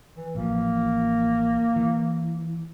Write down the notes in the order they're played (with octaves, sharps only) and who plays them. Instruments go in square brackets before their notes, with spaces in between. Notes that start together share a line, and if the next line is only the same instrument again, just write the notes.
[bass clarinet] E3
[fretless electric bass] A1 F3 [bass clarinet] A#3
[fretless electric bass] E3